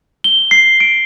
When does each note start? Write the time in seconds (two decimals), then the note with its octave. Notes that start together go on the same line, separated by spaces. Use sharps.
0.24 G7
0.51 C7
0.80 D7